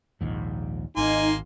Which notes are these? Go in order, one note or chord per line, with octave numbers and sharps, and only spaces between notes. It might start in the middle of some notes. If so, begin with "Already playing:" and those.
A#1 D#2 G#2
G#1 A#3 D#4 G#5 C6